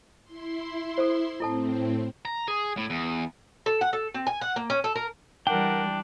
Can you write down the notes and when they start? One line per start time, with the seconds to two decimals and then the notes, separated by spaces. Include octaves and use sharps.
0.24 E4 C6
0.98 A4 C5
1.40 A2 C4 E4 A4 A5
2.25 A#5
2.48 G#4
2.77 A2
2.90 E2
3.66 A4
3.81 F#5
3.93 A4
4.14 C4
4.27 G#5
4.41 F#5
4.56 A#3
4.70 C#4
4.84 A4
4.96 A#4
5.47 E3 G3 D4 A#4 F#5 G5